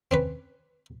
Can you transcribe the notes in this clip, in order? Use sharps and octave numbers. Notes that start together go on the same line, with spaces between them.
C4 C#4 B4